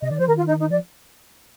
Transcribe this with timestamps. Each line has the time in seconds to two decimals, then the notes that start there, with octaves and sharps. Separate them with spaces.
0.02 C3 D#5
0.11 D#3 D5
0.19 F3 C5
0.28 D#3 A#4
0.37 F4
0.48 D#4
0.60 D#4
0.71 F3 D5